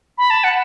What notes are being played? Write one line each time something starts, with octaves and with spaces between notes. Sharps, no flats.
B5
A5
F#5